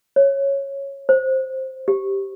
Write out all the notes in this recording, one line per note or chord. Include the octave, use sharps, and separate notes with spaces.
C#5
C5
G4